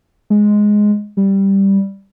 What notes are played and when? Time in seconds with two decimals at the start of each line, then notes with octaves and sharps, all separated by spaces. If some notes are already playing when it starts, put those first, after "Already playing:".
0.30 G#3
1.17 G3